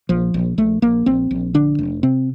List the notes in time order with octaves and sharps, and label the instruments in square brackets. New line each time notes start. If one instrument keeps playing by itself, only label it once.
[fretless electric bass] A#1 F3
A#1
A#1 A3
A#1 A#3
A#1 C4
A#1
D3 D4
F1
C3 C4